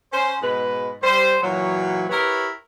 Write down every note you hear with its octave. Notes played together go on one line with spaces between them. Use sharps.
C#4 C5
G#2 B2 G#3 B4
G3 C5
A#2 E3 F#3
E4 G4 A#4 B4 C#5